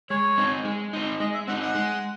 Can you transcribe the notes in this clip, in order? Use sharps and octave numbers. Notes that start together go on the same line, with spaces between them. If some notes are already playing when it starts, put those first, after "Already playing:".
G#3 C#5
C4 D#4
G#3
C4 D#4
G#3 D#5
E5
C4 D#4 F#5
F#5
G#3